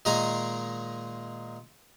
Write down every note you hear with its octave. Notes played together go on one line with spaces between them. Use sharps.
A#2 D#3 G#3 G#4 A#5